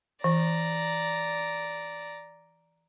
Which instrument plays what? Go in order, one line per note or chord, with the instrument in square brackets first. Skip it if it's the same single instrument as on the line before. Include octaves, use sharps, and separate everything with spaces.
[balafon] E3 [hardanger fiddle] D5 A#5